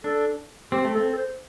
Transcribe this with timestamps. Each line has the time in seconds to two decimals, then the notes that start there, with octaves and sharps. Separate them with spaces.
0.04 D4 A4
0.72 C4 G4
0.85 A3
0.95 C4 A4
1.13 A4
1.17 C5